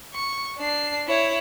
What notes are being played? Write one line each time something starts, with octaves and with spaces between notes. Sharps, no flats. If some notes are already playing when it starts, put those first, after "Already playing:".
C#6
D4 C7
E4 C#5